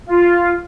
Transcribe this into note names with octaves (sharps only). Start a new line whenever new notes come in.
F4